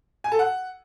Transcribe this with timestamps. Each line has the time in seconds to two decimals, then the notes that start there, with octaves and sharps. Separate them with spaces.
0.24 G#5
0.32 A4
0.39 F#5